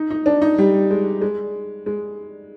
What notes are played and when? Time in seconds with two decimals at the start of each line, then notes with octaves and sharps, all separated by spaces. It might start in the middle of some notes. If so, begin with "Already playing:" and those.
Already playing: D#4
0.10 D#4
0.26 D4
0.42 D#4
0.58 G3
0.91 G#3
1.21 G#3
1.86 G#3